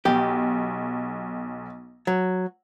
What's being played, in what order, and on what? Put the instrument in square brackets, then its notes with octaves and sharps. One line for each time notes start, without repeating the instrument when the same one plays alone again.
[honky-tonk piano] B1 [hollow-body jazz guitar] G4
[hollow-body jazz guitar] F#3